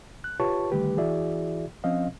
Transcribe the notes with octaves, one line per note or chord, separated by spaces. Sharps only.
F#6
F4 G4 B4 C#5 A5 C#6
D3 D#3 G3 A3 G4 B4
E3 E4 F#4 G#4 D5 E5
F3 C4 C#4 D#5 F5